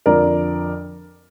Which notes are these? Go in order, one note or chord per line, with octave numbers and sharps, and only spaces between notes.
F2 D3 F3 A#4 D5